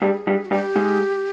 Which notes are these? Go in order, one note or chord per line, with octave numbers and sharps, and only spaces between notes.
G2 G3 G#4
G2 G3
F#4
G2 G3 G4
G#2 G#3